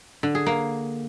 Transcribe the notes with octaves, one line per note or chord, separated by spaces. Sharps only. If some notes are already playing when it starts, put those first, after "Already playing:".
D3
G#4
A#3